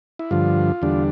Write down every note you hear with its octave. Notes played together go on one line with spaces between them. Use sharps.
E4
G2 D3 F3 F4
E2 D3 G3 D4